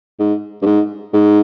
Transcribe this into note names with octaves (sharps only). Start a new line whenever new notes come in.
G#2
G2
G#2
G#2